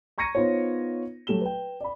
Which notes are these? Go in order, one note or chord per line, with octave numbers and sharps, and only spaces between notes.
A#5 C#6 G#6 A#6 C#7 D#7
B3 D#4 F4 C5 C#5
F#3 A3 G4 E7 G7
B4 G5
D5 B5